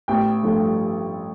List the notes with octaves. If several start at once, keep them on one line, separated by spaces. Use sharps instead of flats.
A1 G5
G2 F3 A3